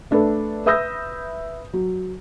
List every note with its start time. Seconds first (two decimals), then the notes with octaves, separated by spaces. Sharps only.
0.11 A3 D4 A4 B4
0.66 B4 E5 D#6 E6 G6 A#6
1.73 F#3